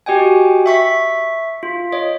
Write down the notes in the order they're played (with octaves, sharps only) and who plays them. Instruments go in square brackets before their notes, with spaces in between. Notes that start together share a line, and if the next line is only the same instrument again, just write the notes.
[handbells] F#4 G4 D#5 G5 G#5
E5 C#6 B6
F4
C#5 D#5